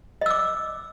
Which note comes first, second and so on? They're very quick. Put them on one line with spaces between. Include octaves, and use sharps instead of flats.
D#5 E6 D6